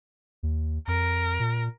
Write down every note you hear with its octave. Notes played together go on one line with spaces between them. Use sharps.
D#2
F2 A#4
A#2